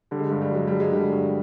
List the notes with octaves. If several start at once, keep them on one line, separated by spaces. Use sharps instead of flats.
D3 G3
G#3
G3
G2
G3
F#3 G#3
G3
G2
G#3
D3 G3
G2